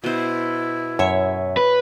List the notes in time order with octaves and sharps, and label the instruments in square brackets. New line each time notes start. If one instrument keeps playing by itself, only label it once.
[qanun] B2 C5 [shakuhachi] E4
[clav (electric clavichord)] F#2 [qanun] C#5 E5
[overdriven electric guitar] B4